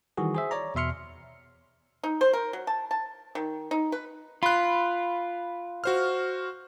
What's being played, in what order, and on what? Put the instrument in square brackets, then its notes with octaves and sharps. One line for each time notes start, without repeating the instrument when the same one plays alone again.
[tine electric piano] D#3 E3 G3 F#4 G#4
G#4 C5 E5
C#5 D5 A#5
E2 B2 E5 C6 F6 C#7
[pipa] D#4
C5
A#4
F#3
A5
A5
D#3
D#4
B4
[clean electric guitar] F4 [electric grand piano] B5 F#6
[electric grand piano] F#4 C5 F6